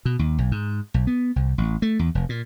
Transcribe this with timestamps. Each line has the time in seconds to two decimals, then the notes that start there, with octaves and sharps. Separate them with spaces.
0.05 B2
0.19 D#2
0.39 B1
0.51 G#2
0.94 B1
1.07 B3
1.36 C2
1.58 A1
1.82 A3
1.99 E2
2.15 F1
2.29 A#2